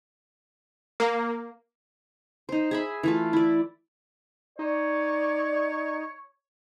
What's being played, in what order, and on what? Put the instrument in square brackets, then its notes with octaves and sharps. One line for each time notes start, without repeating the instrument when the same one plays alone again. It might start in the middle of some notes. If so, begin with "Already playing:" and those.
[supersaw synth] A#3
[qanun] D#4 C5
G#4 E5 B5
E3 A3 F4
E4 D5
[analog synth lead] D#4 [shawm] C#5 [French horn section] D5